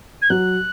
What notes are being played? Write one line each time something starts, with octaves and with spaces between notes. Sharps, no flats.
G#6
F#3 F#6